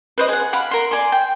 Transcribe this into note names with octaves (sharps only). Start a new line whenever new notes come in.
B4 C5 D#5
G#4 F#5
F5 F#5 B5
A#4 C6
D5 G#5 C6
G5